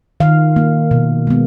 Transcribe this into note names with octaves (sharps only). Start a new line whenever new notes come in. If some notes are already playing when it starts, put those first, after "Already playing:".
D#3 F5
A#3
B2
G#3 B3